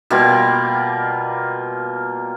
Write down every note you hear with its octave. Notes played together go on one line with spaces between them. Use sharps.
B2 G3 A#3 F4